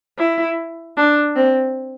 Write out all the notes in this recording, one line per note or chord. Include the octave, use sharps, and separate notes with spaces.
E4
D4
C4